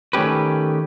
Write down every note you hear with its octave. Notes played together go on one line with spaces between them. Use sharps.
D#3 A3 C#4 G4 B4